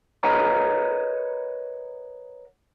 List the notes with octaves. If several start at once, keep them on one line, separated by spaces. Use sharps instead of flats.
A#4 B4 C#5 D#5 F#5 A#5